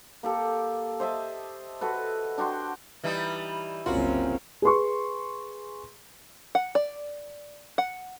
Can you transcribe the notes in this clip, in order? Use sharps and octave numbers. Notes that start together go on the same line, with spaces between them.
A#3 G4 A4
C5 D#5 E5 A5
F#4 A4 B4
D4 F#4 G5 C6
E3 G3 D#4
F#1 C2 C4 C#4 F4 F#4 A#4 C5
G#4 B4 C6 C#6
F#5
D5
F#5